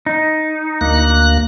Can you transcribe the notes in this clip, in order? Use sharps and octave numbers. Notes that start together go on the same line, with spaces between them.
D#4
D2 A#3 F#6